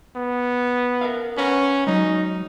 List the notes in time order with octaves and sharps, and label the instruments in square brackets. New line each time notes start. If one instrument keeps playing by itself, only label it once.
[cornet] B3
[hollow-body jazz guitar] A#4 E5 F5
[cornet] C#4 [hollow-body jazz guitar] B4 F#5 A#5
[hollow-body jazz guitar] F#3 G#3 [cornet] D#4